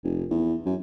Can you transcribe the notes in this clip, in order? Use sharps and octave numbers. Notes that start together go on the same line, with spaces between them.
F1
E2
F#2